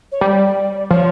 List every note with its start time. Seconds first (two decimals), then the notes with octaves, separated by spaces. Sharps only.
0.12 C#5
0.21 G3 D5
0.91 F3 C#5